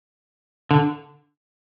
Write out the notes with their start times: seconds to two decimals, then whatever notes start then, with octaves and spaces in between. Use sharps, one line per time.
0.71 D3